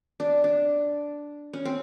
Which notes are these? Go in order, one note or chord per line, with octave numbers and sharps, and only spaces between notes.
D4
D4
C#4
C4